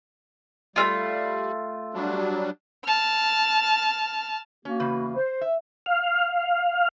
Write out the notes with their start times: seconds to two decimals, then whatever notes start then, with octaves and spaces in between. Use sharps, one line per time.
0.76 G3 A3 C#4 F4
1.94 F#3 G3 D4
2.85 A5 F6
4.65 A#3 C#4 F#4
4.80 E2 C#3 B4
5.15 C5
5.41 E5
5.86 F5